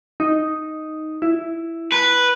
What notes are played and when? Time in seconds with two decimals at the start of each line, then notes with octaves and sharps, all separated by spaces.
0.20 D#4
1.22 E4
1.92 B4